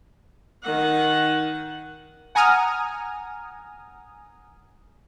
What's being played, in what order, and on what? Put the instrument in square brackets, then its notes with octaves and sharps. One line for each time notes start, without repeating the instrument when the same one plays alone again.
[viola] D#3 F#5
[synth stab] F#5 G#5 A#5 D#6 F6